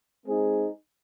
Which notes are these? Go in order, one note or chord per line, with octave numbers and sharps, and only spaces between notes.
G#3 C4 D#4 G#4 C5